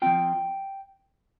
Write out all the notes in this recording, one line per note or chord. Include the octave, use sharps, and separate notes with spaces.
F3 C4 F4 G5